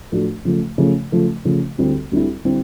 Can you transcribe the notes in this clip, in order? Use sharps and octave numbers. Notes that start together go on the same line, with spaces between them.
A2 F3 A3 D4 F#4
C#3 F3 A3
C#3 F3 A3
C#3 F3 A3
C#3 F3 A3
D2 D3 G3 C4 E4
D2 D3 G3 C4 E4
D3 G3 C4 E4